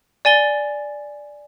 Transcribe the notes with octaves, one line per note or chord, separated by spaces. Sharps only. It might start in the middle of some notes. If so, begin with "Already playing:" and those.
D5 G#5 A6 G7